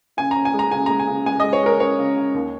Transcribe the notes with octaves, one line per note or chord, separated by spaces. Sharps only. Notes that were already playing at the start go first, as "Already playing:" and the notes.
C#3 G#5
C#4 A#5
G#5
G#3
A#5
C#3 G#5
G#3 A#5
G#5
C#3
G#3 G#5
G#3 D#5
C#5
G#3 A#4
C#4 C#5
C#3
C#3
D#2